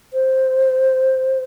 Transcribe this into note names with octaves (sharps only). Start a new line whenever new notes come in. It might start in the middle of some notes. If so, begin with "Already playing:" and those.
C5